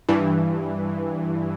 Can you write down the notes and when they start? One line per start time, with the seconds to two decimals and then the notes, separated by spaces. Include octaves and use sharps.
0.09 G2 E3